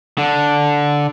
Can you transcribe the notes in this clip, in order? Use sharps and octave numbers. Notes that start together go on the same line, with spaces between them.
D3